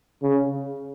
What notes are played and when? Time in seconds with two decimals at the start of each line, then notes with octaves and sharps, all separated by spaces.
0.22 C#3